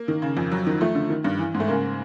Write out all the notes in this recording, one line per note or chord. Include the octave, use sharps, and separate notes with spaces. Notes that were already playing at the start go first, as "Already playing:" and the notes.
Already playing: A#3
D#3
C#3
F2
F#3
D#3
F3 A3
D3
D#3
G2
E3
G#2
A3
C#3 A#3